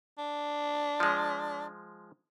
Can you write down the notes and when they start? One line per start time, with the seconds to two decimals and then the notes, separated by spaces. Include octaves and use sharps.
0.18 D4
1.00 F3 G#3